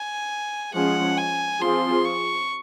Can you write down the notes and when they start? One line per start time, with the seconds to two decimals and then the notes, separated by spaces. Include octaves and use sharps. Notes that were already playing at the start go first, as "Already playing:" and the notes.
Already playing: G#5
0.74 F3 G#3 C#4 G#4 F#5
1.17 G#5
1.62 F3 C4 F4 G#4 C6
2.05 C#6